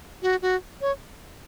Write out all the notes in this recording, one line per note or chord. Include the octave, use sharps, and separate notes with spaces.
F#4
F#4
C#5